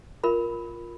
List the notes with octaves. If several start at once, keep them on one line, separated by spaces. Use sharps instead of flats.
F4 A#4 B5